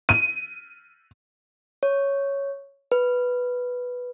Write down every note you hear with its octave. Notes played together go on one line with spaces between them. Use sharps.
D#7
C#5
B4